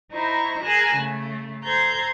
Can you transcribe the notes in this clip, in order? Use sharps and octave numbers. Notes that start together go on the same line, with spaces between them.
D#4 E4 C5 A#5 C#6
G#4 A#4 G#5 A5 F#6 A#6
C#3 A3
A4 C5 A#5 G6 G#6